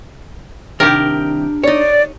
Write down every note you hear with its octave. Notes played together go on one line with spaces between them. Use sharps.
C2 D#3 D4 G4 A#4
D#4 C#5 D5